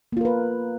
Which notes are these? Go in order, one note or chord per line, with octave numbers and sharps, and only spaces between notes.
A#3 F4 A#4 B4